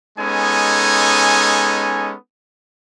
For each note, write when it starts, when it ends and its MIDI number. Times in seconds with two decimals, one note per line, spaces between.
0.19 2.15 56
0.19 2.15 59
0.19 2.15 61
0.19 2.15 63
0.19 2.15 69
0.19 2.15 80